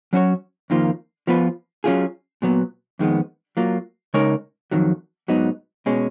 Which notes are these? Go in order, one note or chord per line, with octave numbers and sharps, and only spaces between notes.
F#3 C#4 F#4 C#5
F2 D#3 A#3 F4
F3 B3 F4 B4
F#3 C#4 F4 G#4
A#2 F#3 B3
F2 D#3 G#3 B3
F#3 A#3 F4
C#3 G#3 D#4 A#4 C#5
F2 D#3 F#3
G#2 F#3 B3 D#4
B2 G#3 C#4